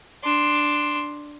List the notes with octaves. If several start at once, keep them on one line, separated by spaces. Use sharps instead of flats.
D4 C6